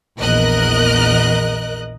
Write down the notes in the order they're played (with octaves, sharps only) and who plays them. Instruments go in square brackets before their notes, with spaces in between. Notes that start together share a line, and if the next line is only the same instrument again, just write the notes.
[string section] A#1 E2 A#4 D#5 F#6